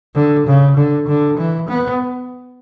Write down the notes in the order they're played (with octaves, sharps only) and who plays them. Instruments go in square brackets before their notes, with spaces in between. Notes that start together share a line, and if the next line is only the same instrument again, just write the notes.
[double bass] D3
C#3
D3
D3
E3
B3